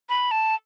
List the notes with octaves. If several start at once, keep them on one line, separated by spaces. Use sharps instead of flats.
B5
A5